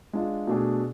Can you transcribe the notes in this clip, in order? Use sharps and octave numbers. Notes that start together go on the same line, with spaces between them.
G#3 D4 F4
B2 A3 D4 G#4